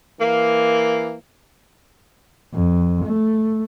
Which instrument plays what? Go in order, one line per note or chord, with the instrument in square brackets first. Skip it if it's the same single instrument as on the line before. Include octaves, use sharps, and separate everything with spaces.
[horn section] E3 A#3
[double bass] F2
A3